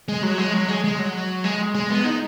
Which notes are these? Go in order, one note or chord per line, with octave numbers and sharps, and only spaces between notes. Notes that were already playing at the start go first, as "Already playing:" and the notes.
G#3
F#3
G#3
F#3
G#3
G#3
F#3
G#3
G#3
B3
D#4